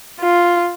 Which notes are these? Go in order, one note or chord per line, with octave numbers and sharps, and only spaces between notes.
F4